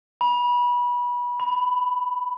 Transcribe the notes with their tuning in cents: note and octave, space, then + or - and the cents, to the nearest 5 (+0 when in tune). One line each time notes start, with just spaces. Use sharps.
B5 -25
B5 +10